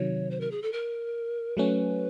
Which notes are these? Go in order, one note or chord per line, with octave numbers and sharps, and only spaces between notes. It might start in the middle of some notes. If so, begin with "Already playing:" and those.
Already playing: C3 D#3 F#3 C#5
C5
A#4
G#4
A4
A#4
F#3 A3 C#4 B4